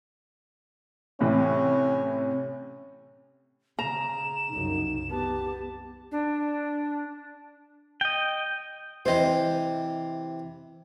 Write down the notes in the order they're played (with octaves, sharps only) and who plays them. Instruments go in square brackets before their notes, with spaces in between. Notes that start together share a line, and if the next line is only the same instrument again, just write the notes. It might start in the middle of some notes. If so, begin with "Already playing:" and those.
[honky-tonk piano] A2 C3 E3 [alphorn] C#4
[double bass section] C#3 [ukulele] A#5 [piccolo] E7
[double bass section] C2 F#2 C#3 [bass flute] D#4
[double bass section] B3 [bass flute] G4 [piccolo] A5
[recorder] D4
[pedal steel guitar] D#5 G5
[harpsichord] C3 E3 [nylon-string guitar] C5 D#5